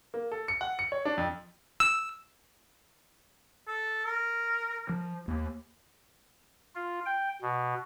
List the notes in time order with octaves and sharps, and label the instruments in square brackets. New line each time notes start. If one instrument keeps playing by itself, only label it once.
[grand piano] A#3
A4
C#7
F#5
C#7
C#5
D4
F2
[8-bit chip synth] E6
[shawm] A4
A#4
[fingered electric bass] F3
D#2 A#3
[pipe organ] F4
G5
B2